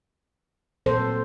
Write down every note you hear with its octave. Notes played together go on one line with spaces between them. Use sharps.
A#2 F#3 A3 A4 C5